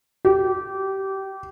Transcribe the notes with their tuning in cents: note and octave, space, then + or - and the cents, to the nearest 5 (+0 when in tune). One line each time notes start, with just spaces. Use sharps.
G4 -20